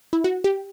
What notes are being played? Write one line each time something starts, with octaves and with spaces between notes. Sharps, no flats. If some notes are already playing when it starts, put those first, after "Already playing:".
E4
F#4
G4